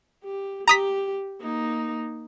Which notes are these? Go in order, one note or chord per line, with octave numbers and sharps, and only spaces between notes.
G4
G4 A#5 D#6 B6
A#3 D#4